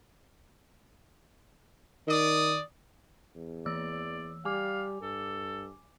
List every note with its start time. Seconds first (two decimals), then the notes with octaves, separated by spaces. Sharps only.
2.07 D#3 D5 D#6
3.35 E2
3.66 E3 D5 E6
4.45 G3 F5 G#5 D6
5.02 G2 A4